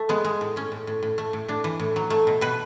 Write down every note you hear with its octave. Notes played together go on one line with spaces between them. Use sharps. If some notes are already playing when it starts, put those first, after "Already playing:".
Already playing: A3
G#3 B3
G#3
A2
A2 C#4
A2
A2
A2
A3
A2
A2 D4
E3
A2
F#3
A3
B2
B2 B4